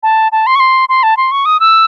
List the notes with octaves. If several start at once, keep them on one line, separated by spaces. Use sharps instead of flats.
A5
A5
C6
C#6
C6
C6
A5
C6
C#6
D#6
E6